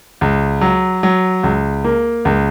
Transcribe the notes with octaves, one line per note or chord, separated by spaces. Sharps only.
C#2
F#3
F#3
C#2
A#3
C#2